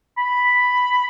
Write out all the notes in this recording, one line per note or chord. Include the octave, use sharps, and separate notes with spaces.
B5